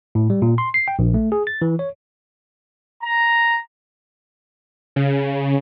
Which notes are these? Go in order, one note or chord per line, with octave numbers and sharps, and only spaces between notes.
A2
G3
A#2
C6
C7
G5
A#1
A3
G#4
A6
E3
C#5
A#5
C#3